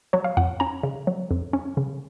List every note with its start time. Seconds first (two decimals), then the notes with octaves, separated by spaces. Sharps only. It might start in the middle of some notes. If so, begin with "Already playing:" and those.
0.13 F#3 C#5
0.24 F5
0.37 F2 F#5
0.60 C#4 A#5
0.83 C#3
1.07 F#3
1.31 F2
1.53 C#4
1.77 C#3